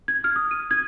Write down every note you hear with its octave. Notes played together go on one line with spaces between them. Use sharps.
G#6
F6
D#6
D#7
G#6